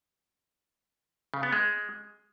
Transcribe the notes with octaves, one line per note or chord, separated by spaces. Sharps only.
C#3
B3
G#3